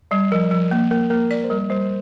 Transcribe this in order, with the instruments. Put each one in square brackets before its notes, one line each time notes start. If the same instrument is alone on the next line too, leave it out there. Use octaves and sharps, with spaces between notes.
[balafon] G3 [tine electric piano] D5
[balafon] F3 [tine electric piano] A#4
[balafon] F3
A#3
[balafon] A#3 [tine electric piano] A#4
[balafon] A#3 [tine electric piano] A#4
[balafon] D5
[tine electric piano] C5
[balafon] G3 [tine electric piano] A#4
[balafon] G3 [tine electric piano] C5